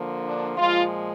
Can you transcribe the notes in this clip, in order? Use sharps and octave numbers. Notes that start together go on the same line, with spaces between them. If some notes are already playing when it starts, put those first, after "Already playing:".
Already playing: D3 F3 A#3
D4
A#2 F3 G#3 F4